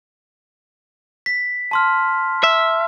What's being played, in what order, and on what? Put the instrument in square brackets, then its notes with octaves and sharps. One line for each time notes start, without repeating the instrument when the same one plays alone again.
[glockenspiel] B6
A5 C6 F6
[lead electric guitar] E5